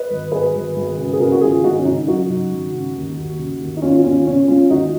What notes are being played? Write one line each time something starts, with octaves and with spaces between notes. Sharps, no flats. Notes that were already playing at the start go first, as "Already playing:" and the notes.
Already playing: B4 D#5
G#1
G#1 G#4 B4
G#1
G#1
C#3
G#4
C#3 F#4 A#4
F#4
G#1 F4 G#4
G#1 D#4 F#4
C#4
C#3 D#4
F#2 D#4 F#4
C#3
G#1
C#3
D#2
D#2
C#3
D#2
D#4
D#2 C#4 F4
F#4
D#2 C#4 F4
C#3 C#4
G#3 C#4 F4
D#2 D#4 F#4